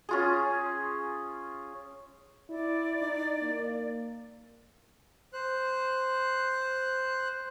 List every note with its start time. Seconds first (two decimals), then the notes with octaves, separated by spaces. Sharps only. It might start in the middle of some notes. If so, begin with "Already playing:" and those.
0.09 C#4 F4 G#4
2.49 E4 D5
3.02 D#4
3.42 A#3
5.33 C5 F#6